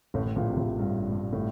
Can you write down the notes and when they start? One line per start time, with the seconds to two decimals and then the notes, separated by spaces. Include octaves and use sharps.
0.14 A1 A2
0.25 A2
0.36 A#1 A#2
0.48 C3
0.57 A#1 A#2
0.79 G2
1.12 G2
1.33 A2